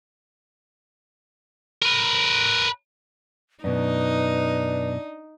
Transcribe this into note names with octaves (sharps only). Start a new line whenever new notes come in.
A#4 B4
F#2 B2 D4 D#4 B4